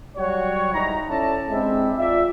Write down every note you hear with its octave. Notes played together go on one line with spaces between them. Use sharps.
F#3 G3 F#4 C#5
G#2 G3 D#4 E4 A#5
C#4 E4 A4 D5 E5 A5
G#3 C4 D4 E4 G4 E5
F4 D5 E5